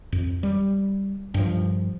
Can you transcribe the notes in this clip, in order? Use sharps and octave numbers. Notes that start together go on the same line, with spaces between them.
F2
G3
G2 F3